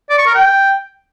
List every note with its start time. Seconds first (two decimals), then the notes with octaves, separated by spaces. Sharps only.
0.10 D5
0.18 C#6
0.27 A#4
0.35 G5